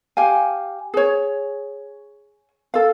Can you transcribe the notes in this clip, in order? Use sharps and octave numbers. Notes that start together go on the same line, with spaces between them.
G4 F5 G#5
G#4 C#5
A4 F5